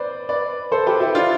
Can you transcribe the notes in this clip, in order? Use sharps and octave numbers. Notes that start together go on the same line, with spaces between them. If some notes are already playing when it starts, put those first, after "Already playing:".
Already playing: B4 C5 D5
B4 D5
A4 C5
G4 B4
E4 G4
D4 F4